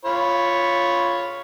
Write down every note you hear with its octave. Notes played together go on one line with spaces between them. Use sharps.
F4 C#5 B5